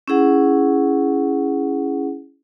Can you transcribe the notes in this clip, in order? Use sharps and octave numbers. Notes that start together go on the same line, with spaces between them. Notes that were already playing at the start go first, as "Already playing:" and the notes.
C#4 E4 G#4 F#5